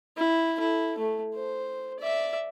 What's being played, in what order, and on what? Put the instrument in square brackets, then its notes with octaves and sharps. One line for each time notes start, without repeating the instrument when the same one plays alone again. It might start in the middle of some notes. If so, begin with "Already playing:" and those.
[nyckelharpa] E4
E4 A4
A3
C5
D5 E5